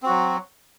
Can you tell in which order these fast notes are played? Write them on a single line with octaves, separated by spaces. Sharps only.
C4 F#4 F#3